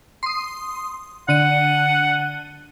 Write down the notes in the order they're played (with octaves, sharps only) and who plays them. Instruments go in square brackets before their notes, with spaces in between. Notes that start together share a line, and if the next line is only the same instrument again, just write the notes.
[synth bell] C6 D#6
[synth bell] D3 D#7 [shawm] F#5